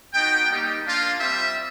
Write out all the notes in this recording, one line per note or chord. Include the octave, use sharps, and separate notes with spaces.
B3 D#4 F#4 G5
G3 A#3 D#4 G4
A#3 D4 F4
G3 C4 F4 E5